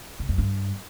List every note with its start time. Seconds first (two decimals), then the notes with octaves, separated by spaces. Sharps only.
0.19 C3
0.29 F#2
0.38 G2